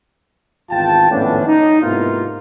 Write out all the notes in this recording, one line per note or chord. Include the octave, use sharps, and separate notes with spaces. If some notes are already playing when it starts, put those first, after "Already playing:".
G#1 E2 F4 G5 A5
G#1 F2 A2 B3 C#4 D4
D#4
G#2 C3 A#3 B3 E4 F4